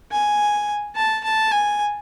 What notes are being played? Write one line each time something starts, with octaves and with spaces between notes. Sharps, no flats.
G#5
A5
A5
G#5